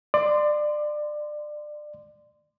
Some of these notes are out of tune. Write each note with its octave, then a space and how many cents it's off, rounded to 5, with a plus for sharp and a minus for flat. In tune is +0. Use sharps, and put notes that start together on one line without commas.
D5 +25 C6 -15